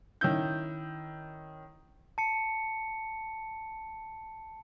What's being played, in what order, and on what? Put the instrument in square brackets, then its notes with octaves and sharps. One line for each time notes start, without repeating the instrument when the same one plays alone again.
[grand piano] D#3 C#4 E4 G6
[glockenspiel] A5 C#7